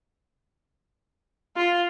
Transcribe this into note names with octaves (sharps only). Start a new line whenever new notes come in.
F4